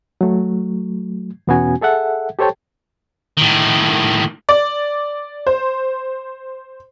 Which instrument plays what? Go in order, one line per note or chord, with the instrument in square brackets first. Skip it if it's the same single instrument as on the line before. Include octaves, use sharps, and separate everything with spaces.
[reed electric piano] F#3 A3
E2 B2 B3 C#4 F#4 G#5
G#4 A4 E5 F#5
G4 A4 C5 C#5 G5 A5
[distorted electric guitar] A2 D#3
[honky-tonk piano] D5
C5